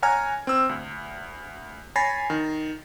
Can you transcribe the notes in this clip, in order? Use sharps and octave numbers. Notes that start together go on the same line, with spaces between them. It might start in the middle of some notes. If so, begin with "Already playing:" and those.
C#5 F#5 G#5 A#5 F6 G#6
C4 E6
D2
C#5 G#5 B5 A6 A#6 C7
D#3